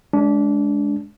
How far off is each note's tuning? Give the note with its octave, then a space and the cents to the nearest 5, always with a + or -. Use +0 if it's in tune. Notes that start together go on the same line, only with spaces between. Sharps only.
G#3 +20 D4 -25